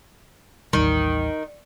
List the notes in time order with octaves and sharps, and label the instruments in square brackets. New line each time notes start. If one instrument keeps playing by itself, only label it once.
[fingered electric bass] A1 D#2 G3 [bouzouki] D#3